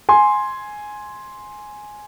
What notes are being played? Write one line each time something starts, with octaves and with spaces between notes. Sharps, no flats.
G#5 C6